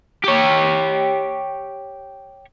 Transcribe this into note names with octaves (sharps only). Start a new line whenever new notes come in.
G4 C#5